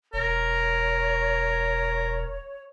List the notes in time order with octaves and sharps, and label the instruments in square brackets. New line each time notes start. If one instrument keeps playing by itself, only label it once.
[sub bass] E1 [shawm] A#4 [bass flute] C#5